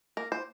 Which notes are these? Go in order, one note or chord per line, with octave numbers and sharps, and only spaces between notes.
A#3 A#4
A#3 C5